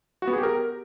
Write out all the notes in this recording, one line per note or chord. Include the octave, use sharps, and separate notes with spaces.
F#4
B3
G#4
G4
A#4